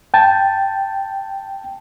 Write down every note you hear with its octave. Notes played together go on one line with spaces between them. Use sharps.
G5 A5